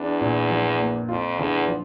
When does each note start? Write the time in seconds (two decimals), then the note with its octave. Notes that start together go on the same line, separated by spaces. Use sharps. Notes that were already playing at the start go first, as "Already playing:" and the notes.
Already playing: E2 D4
0.21 A#2
0.50 F3
0.79 A#3
1.09 F2 F4
1.39 E2 D3
1.68 F3